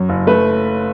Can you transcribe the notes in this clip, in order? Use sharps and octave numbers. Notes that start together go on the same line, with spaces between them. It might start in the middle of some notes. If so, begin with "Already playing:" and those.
Already playing: F#2 F#3
F#1
A3 B4